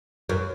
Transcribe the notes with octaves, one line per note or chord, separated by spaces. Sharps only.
F#2